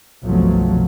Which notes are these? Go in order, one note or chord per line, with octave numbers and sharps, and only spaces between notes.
G1 C2 B2 F3 F#3 A3